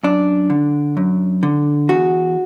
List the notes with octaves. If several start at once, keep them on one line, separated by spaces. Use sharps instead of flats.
F#2 D4
D3
F#2
D3
E2 F#4